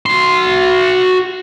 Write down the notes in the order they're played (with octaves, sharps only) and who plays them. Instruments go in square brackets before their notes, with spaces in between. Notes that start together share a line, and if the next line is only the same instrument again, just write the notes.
[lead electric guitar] F#4 C6